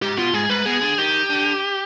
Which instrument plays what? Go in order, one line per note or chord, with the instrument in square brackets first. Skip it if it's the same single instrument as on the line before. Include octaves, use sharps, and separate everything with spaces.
[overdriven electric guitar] G#2 [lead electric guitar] G4
[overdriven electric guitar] B2 [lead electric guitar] F4
[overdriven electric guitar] G#2 [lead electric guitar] G#4
[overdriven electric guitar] G#2 [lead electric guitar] B4
[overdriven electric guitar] B2 [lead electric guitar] G#4
[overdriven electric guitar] D3
[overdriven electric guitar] D#3 [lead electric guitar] G4
[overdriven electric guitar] D3